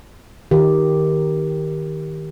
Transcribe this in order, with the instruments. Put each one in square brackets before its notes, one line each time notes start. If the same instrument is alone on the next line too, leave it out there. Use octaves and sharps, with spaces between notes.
[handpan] D#3 G4